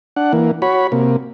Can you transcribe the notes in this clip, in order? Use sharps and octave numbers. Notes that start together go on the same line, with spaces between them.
D4 F#5
E3 A#3
F#4 C#5 B5
C3 A#3